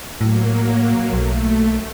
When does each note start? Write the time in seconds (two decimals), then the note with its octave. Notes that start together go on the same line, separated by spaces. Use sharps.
0.21 A2 F#3 A#3
1.13 B1 A3